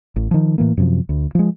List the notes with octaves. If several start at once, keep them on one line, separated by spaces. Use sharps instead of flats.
A1
D#3 F3
A2 E3 A#3
F#2 C3 F3
D2
F3 G#3